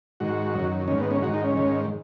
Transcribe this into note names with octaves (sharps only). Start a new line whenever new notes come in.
G#2 D#3 F#4
F#2
D#3
G#2 D#3 C#4
B3
C#4
G#2 D#3 F#4
D#4
C#4
G#2 D#3